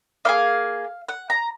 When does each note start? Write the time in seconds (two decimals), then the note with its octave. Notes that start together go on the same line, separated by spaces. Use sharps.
0.25 A#3 D#4 G#4 F5
1.09 F#5
1.30 A#5